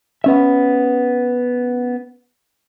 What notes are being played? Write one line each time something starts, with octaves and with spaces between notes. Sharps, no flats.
B3 C#4 E5